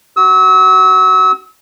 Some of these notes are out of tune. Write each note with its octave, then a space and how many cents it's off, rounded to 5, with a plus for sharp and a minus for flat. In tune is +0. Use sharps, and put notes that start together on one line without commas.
F#4 +20 E6 -35